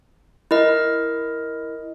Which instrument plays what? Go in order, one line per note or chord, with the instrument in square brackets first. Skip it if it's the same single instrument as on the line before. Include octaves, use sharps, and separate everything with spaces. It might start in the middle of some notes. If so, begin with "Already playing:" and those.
[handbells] E4 A#4 D#5